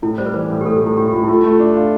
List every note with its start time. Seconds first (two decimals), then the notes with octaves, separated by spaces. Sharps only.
0.02 A2 E4
0.18 G3 C5
0.26 B4
0.34 E3 C5
0.50 A2
0.61 G4
0.65 A2 A4
0.77 G4
0.81 A2
0.86 E4
0.97 A2 G4
1.08 G4
1.13 A2 F4
1.24 E4
1.28 A3 F4
1.44 A3
1.60 D4
1.75 F4